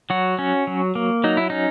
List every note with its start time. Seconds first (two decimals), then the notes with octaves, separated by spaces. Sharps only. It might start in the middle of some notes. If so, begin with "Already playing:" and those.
0.10 F#3 F#4
0.39 C#4
0.67 F#3
0.95 A#3
1.24 F#3 D#4
1.37 E4
1.50 C#4 D#4